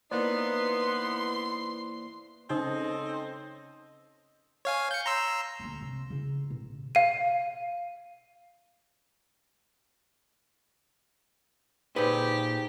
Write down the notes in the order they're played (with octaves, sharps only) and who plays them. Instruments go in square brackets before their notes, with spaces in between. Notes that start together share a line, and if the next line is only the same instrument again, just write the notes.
[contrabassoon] E3 [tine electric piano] A#3 C5 D5 [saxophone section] B3 D#4 [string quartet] C6
[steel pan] C#3 [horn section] C4 A4 [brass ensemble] C#4 D#5 [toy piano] D#4 C5 D#6
[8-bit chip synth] C#5 F5 G#5
G6 C#7
A#5 C6 E6
[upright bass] D#1 D2
C3
C#3 E4
A1 B2
[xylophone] F5 D#7
[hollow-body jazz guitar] A#2 B4 [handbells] D#4 G#4 C5 [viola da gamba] G4